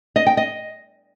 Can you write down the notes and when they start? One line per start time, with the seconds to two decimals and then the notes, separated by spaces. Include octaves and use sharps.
0.16 D#5
0.27 G5
0.37 D#5